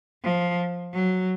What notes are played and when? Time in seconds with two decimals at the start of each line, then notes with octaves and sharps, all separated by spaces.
0.24 F3
0.93 F#3